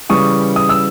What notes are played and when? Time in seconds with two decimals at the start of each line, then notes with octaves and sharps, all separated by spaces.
0.09 C#3 E3 G3 C#6 D#6
0.56 D#6
0.69 E6